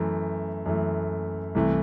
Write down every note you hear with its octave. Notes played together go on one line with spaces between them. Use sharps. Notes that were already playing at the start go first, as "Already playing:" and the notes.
Already playing: F#2 E3 A3
F#2 E3 A3
C2 C3 E3 A3